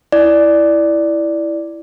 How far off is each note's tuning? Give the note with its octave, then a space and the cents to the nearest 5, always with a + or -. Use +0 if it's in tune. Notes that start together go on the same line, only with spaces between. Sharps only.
E4 +0 D5 +0